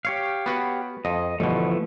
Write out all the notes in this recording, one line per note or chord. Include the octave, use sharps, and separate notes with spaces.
G4 C#5 F5
B3 F#4 B4
F2 D#5
G1 B2 E3 F3 A3